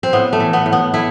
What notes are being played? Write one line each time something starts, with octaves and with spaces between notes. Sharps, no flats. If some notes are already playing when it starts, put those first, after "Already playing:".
C4
A2 B3
A3
E3
B3
A2
B3
A3 E4